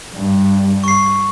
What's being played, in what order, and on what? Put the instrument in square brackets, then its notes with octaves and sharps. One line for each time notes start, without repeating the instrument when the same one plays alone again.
[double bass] G2
[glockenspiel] C#6 C7